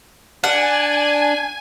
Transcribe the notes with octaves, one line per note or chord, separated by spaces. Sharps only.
D4 F#5 G#5